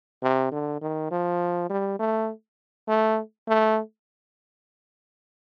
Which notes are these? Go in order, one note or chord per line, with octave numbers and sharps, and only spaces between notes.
C3
D3
D#3
F3
G3
A3
A3
A3